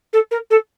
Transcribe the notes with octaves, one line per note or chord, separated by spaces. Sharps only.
A4
A#4
A4